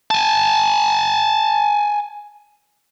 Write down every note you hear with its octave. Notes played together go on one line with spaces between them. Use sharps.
G#5 A5